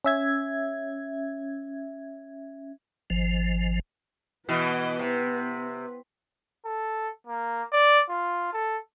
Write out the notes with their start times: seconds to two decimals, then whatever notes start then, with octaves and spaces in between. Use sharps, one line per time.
0.05 C#4 E5 G#6
3.10 G#1 F3
4.49 B2 E3 B3 B4
4.99 C3
6.65 A4
7.27 A#3
7.73 D5
8.09 F4
8.53 A4